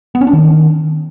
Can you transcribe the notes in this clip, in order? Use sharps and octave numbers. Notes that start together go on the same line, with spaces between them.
B3
C#4
D4
D#3